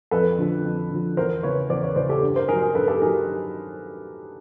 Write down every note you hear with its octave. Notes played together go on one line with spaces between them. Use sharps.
F2 A4 B4
D3 F3
F2
D3 F3
E2 A#4 C5
C#3 E3 B4 C#5
E2 C5 D5
B4 C#5
C#3 E3 C5 D5
G4 A4
G2
A#4 C5
D#3 F#3 G#4 A#4
G#4 A#4
G2 A4 B4
G4 A4
D#3 F#3 G#4 A#4